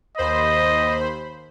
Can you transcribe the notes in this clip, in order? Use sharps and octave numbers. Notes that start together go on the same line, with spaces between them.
D#2 C5 D#5 B5